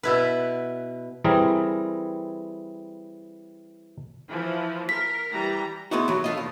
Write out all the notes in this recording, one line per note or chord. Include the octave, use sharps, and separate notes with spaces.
B2 E4 B4
E3 G3 C4 G#4 A#4
E3 F3
A#4 B6
E3 G3 A#5
G#3 B3 D#4 E4 F#4
E3 F#3
A3 F4 D#5
E2